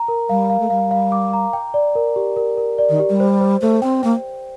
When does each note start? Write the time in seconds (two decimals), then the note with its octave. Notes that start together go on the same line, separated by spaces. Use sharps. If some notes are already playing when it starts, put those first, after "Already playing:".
Already playing: A#5
0.08 A#4
0.29 G3 F5
0.50 F5
0.60 A3
0.70 G3 F5
0.91 F5
1.12 D6
1.33 A#5
1.53 G5
1.74 D5
1.95 A#4
2.16 G4
2.36 A#4
2.57 A#4
2.78 D5
2.89 D#3
2.99 G4
3.10 G3
3.20 C5
3.41 C5
3.61 A3 C5
3.82 C4 G5
4.03 A#3 G5